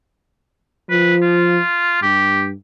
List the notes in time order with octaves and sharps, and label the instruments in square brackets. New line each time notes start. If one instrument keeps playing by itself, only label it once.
[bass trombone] F3 [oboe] B4
[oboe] F4
[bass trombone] G2 [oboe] G4